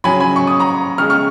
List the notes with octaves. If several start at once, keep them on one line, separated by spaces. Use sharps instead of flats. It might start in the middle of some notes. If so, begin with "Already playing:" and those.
C#3 F#3 G#5 B5
G#5 B5
C#6
D#6
A#5 C#6
C#3 G#3 C#6 F6
C#6 F6